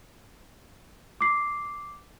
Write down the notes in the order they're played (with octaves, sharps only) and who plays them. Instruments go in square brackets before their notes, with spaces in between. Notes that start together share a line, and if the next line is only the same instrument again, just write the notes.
[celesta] D6 C7